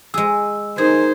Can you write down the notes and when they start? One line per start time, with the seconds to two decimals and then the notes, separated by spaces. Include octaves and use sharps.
0.14 G#3 G#4 E6
0.78 D#4 G#4 A#4 C5 G#6